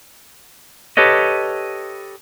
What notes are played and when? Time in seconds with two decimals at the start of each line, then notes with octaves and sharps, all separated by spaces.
0.97 G4 A4 B4 C#5 D#5